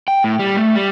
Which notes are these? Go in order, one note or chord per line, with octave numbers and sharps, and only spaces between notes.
G5
A2
G3
A3
G3